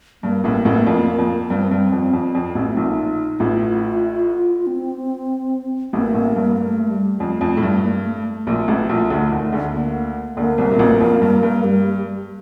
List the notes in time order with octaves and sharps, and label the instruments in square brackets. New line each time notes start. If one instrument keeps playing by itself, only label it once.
[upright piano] G2 [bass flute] A#3
[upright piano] A1 A2
A1 A2
F2
F2
[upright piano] G2 [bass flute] C4
[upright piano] G2
F2
[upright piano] F2 [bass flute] C4
[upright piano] F2
A1 A2
[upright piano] A#1 A#2 [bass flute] D#4
[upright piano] A1 A2 [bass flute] F4
[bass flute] C4
[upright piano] A1 A2 [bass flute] A#3
[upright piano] A1 A2
G2
[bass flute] A3
G3
[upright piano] F2 [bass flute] A3
[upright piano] F2
A2
G2
[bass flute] A#3
A3
A3
[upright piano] A#1 A#2
A1 A2
A#1 A#2
D2 D3
D#2 D#3
D2 D3
[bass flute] A#3
[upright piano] D2 D3 [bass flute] A#3
[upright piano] C2 C3
A#2
A1 A2
F2
G2
G2
[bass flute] G3